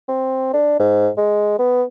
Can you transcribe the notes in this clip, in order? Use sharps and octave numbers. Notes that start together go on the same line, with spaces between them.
C4
D4
G#2
G#3
B3